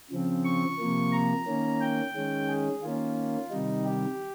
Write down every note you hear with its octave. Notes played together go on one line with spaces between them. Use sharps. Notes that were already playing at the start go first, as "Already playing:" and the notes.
C#3 F3 C4
C#6
C3 F3 A#3
A#5
D#3 A#3 C#4
G5
D#3 G#3 C#4
G#4
D#3 A#3 C#4 F4
C3 D#3 G3 D#4
G4